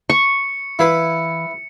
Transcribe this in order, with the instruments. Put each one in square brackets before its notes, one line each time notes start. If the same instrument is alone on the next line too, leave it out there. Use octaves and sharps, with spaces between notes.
[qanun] C#6 [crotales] C#7
[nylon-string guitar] E3 F5 [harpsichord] E4 B4